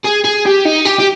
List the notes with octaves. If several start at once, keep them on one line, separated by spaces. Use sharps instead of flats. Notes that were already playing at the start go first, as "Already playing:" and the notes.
G#4
G#4
G4
D#4
G4
G4